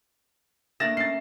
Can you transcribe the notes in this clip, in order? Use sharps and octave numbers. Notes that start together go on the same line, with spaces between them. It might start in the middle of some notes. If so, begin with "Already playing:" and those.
A3 A#3 D4 A6 A#6 E7
C#4 A6 C7